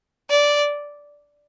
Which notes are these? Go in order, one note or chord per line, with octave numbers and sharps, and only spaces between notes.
D5